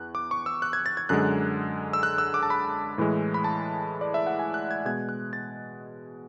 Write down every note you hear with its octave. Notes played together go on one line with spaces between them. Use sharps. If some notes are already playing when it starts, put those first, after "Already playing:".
Already playing: E2 F#6
D6
C#6
E6
F#6
G#6
A6
G#6
F#2 D3 G#3 F#6
E6
F#6
E6
D6
A5
B5
A2 E3 G#3
B5
A5
D5
E5
F#5
G#5
F#6
G#6
B2 G#3 G#6
F#6
A6